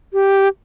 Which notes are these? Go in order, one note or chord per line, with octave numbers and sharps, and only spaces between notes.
G4